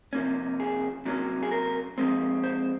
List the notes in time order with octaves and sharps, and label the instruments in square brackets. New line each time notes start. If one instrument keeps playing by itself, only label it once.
[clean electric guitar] C3 F3 A#3 C#4
G#4
C3 F#3 A#3 C#4
G#4
A#4
F3 G#3 C4
C5